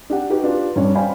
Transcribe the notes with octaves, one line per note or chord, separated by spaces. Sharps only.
D4 G4 F#5
D#4 F#4 G4 B4
D4 F4 G4 B4
G2 C#4 D4 C#5
C5 D5 F5 G5 G#5 B5